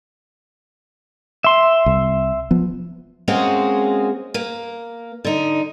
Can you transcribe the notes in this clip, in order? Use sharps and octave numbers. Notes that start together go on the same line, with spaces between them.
E5 C6
C2
F3 B3
G#3 A#3 C4 C#4 F#4 G#4
A#3
D3 D#4